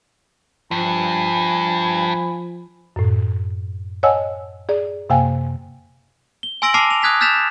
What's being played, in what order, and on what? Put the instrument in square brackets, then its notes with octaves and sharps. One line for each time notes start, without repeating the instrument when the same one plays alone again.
[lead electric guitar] G2 [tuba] F3 [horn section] G#5 B5
[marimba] F#2 A2
C#5 D#5 F#5 G#5 A5 E6
G#4 D5
F#2 C3 A#3 F5 G5 G#5
[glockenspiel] G7
G#5 C6 E6 A#6 D7 F#7
A5 D6 F6 C7 F7
F7
D#6 F#6 G#6 B6 F7
F6 G6 A6 B6 E7 F7